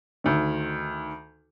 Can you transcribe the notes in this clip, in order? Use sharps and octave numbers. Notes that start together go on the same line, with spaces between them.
D2 D#3